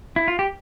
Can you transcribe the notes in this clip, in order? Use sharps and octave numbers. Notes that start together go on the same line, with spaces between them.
E4
F4
G4